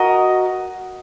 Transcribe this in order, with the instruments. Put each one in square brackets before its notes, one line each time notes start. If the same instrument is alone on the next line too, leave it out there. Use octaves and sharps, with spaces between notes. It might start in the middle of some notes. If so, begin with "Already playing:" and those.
Already playing: [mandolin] F#4 A#4 D#5